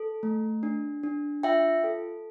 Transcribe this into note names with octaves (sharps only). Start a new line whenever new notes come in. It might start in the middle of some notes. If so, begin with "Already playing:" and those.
Already playing: A4
A3
D4
D4
F4 E5 G5
A4